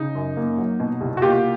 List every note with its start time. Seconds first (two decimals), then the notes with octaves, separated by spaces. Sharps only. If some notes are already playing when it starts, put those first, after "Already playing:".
Already playing: C#3 D#4
0.15 F#2
0.37 A#3
0.58 F#3
0.80 B2
1.01 C2
1.17 F#4
1.22 A#3 F4 G4